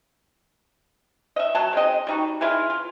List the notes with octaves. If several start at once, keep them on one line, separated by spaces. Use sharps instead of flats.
D#5 E5
F#3 A5
G#3 C4 D#5
G3 D#4 F#4
E3 G#3 E4 F4
F4